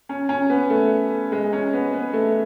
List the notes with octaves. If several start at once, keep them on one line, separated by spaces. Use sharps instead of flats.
C#4
C#4
B3
A3
G#3
C#4
B3
B3
A3